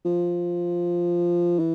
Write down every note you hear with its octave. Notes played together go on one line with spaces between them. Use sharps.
F3
E3